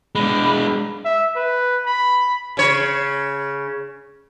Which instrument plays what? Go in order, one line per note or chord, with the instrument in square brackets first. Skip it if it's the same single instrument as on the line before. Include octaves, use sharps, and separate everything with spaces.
[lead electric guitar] G#3 D4 [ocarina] B5
[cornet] E5
B4
B5
[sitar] C#3 C#5